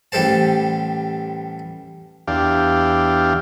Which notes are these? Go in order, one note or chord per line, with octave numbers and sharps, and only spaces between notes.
A1 G3 A4 C5 A5
E2 D4 G4 F5